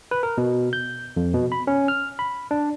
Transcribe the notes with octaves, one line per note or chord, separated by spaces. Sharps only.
B4
A#4
B2
G6
F2
B2
B5
C#4
F6
B5
D4